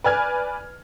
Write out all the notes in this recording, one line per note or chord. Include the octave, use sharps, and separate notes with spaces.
B4 D5 G#5 F6 G#6